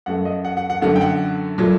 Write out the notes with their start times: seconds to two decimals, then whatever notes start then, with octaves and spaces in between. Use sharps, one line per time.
0.06 F#2 F#3 A3 F#5
0.25 D#5
0.45 F#5
0.57 F#5
0.70 F#5
0.82 F#2 D3 F#3 A3 F#5
0.96 G5
1.01 F#5
1.58 A#2 F#3 A3